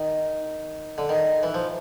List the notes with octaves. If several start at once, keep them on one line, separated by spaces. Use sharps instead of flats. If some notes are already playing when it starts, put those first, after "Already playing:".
Already playing: D#3
D3
D#3
E3
F3